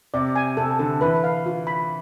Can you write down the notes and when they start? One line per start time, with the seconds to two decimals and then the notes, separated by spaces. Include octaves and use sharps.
0.14 C3 D5
0.36 G#5
0.57 C3 A4
0.79 D3 A4
1.01 E3 B4
1.24 F5
1.46 F4
1.67 B5